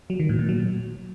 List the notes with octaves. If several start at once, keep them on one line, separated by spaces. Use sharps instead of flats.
F#3
D#3
A2
A#2
F#3